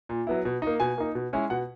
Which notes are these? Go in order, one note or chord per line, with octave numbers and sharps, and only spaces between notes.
A#2
F#3 B3 E4
B2
A#3 D#4
B2 G#5
A#3 D#4
B2
G#3 C#4 E4
B2 F#5